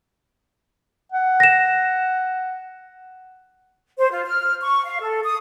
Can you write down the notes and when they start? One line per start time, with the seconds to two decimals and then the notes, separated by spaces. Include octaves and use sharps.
1.12 F#5
1.40 A#6 E7
3.99 C5
4.11 F4
4.26 F6
4.62 C#6
4.85 F5
5.00 A4
5.24 D#6